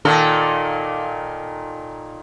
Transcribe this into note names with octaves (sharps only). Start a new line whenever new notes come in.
A#2 D#3 A4